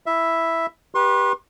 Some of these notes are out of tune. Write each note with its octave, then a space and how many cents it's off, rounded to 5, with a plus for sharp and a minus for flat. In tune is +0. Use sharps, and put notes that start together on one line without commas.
E4 +0 E5 +0
G4 +0 B4 -20 C6 +40